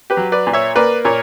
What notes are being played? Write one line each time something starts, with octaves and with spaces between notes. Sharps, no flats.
G4 B4
F#3
B4 D5
A#2
C#5 E5
A#3 B4 D5
A#2 A#4 C#5